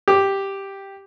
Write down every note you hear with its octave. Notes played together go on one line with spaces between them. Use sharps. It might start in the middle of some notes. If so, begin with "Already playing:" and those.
G4